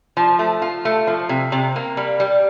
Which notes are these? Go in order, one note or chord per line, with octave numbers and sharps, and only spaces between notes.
F3
A3
F4
A3
F3
C3
C3
A#3
G3
G3